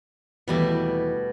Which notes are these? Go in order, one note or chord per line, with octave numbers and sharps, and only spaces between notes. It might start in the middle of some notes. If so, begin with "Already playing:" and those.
D#2 B2 E3 G3 A3